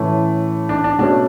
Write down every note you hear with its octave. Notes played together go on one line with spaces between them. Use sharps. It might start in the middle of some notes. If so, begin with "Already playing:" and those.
Already playing: A2 E3 A3 C#4
D4
D4
B2 A3 C#4 D4